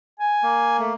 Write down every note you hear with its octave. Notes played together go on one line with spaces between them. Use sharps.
G#5
A#3
A3